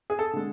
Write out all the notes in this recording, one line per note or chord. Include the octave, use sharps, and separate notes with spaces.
G#4
A4
D3 G#3